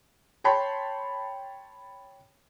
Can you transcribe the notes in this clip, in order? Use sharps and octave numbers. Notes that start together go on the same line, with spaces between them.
C#5 G5 A5 B5 C6